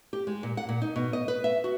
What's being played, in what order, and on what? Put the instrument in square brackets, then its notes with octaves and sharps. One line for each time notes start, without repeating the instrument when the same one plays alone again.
[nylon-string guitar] G4
G#3
A#2
F#5
A#2
D#4
B2
D#5
B4
E5
F#4